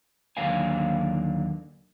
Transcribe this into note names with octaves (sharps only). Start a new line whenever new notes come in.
D#2 D3 F#3 A#3 F5 G#5